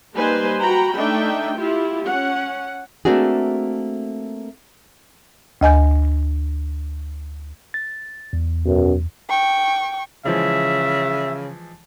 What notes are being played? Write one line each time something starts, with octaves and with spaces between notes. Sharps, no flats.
G3 A#3 D#4 B4 C5 G#5
F#4 G5 A#5 B5
A3 D4 D#4 E5 G5
E4 F4 G4
C#4 F#5
A3 A#3 C4 D4 F#4 G#4
D2 D#5 G#5 G6
A6
E2
B1 F#2
G5 C#6
C#3 E3 F3 G#3 E5